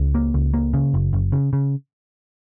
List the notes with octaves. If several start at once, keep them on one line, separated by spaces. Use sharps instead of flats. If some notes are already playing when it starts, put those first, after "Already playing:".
Already playing: C#2
A#3
C#2
A#3
C#3
F#1
F#1
C#3
C#3